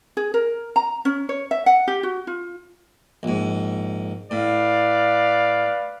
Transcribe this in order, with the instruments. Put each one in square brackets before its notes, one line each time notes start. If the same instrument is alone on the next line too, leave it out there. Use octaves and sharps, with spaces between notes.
[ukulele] G#4
A#4
A#5
C#4
C#5
E5
F#5
G4
F#4
F4
[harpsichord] A#1 G#2
[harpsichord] A2 [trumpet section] B4 D5 F5